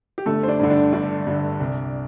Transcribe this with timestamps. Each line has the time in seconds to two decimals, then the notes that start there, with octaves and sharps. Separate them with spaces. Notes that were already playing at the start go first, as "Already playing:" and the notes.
0.18 G4
0.26 G1 A3 A4
0.43 C5
0.48 D4 D5
0.59 G2 D3
0.70 D4 D5
0.93 G1 D4 D5
1.27 G2 D3
1.60 C2